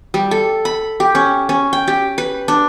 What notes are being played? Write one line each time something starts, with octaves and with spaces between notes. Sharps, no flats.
G3
A4
B5
G4
C#4
C#4
G5
G4
B4
D4